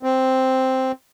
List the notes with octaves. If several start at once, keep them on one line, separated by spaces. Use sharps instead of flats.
C4